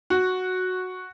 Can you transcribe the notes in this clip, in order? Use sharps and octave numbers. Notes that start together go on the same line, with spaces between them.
F#4